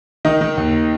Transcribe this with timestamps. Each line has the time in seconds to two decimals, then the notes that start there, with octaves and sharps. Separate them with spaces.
0.25 D#3 D#4
0.41 D#3
0.57 D#2